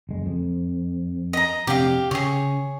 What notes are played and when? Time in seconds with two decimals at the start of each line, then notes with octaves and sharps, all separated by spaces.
0.09 F#1 G#3
0.26 F2
1.33 D#5 A#5
1.67 F2 C3 D4 G4 F5
2.11 C#3 G#4 C#5